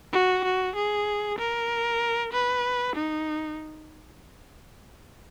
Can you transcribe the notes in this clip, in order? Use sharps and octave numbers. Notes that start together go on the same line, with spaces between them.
F#4
F#4
G#4
A#4
B4
D#4